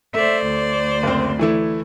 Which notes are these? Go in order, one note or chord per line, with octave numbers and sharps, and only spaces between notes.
A3 C5 D5 E5
D2
F#1 C4
E3 A3 E4